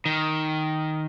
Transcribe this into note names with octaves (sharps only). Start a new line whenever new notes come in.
D#3